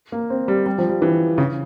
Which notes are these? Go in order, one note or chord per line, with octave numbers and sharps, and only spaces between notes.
A#3
C4
G3
G3
F3
G3
E3
C#3